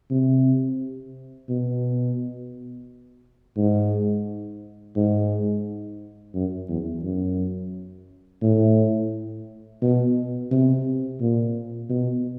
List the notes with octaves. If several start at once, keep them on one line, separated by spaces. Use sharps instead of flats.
C3
B2
G#2
G#2
F#2
E2
F#2
A2
B2
C3
A#2
B2